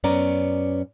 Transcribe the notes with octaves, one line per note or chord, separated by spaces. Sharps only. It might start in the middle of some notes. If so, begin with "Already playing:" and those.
F#2 B3 C#4 D5 A#5